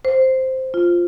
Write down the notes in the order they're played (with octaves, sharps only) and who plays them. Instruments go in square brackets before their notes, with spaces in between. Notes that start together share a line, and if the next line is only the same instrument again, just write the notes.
[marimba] C5
F4